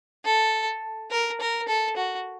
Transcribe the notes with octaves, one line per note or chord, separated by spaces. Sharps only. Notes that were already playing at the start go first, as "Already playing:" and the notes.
A4
A#4
A#4
A4
F#4